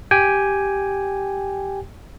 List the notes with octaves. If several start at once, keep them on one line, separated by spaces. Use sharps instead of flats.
G4 G5 G#5